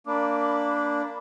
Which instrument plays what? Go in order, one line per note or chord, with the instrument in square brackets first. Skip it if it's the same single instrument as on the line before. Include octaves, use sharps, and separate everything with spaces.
[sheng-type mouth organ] A#3 D4 [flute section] B5 D6